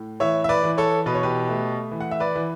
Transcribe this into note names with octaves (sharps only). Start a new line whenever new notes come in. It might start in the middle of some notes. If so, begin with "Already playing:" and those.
Already playing: A2
E3 C#5 E5
E5
B4 D5
E3
A4 C#5
B2 B4
C#5
G4 B4
A3
E3
F#5
E5
B4 D5
E3